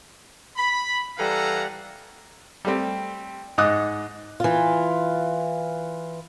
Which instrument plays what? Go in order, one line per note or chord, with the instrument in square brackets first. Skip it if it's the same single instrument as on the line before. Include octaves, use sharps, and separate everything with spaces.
[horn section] B5
E3 G3 A4 F5 F#5 A#5
[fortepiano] G3 A3 C4
G#2 D#4 D#5 D6 D#6 F#6
[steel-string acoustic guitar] E3 F4